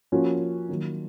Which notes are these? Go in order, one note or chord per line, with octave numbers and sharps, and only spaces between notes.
F3 A#3 C#4 F#4
D#3 F#3 A#3